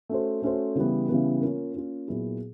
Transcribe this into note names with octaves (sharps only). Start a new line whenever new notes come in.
A3 C#4 F#4 A4 C5
A3 C#4 F#4 A4 C5
C#3 E3 G3 B3
C#3 E3 G3 B3
A#3 C#4 F4
A#3 C#4 F4
A#2 F#3 B3 E4 G#4